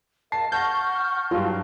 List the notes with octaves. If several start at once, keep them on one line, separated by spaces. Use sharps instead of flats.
A#4 D#5 F5 A5 C7
F#5 A5 C#6 F6 G6 A#6
G2 F#3 F4 F5 A5